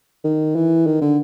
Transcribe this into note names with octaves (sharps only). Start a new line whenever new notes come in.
D#3
E3
D#3
D3